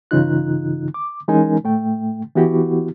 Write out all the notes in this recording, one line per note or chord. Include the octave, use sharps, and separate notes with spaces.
G2 C#3 E3 D#4 F4 F#6
D6
E3 G#3 C#4 D#4 A#4 G#5
A2 A3 G5
E3 B3 E4 F#4 G4